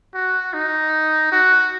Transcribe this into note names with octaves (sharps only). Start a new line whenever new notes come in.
F#4
D#4
F#4